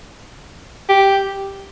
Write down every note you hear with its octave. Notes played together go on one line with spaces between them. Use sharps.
G4